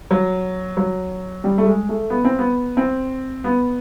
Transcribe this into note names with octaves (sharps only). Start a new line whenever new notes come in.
F#3
F#3
G3
A3
G#3
A3
B3
C4
B3
C4
B3